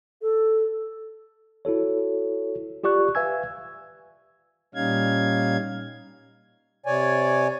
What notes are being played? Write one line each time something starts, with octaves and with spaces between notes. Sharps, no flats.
A4
E4 F#4 A4 C#5
F4 G4 D5 C#6 F#6
B4 E5 F5 G#5 E6 G#6
A#2 G3 C#4 D#4 F5 G#6
C3 C#5 D5 G#5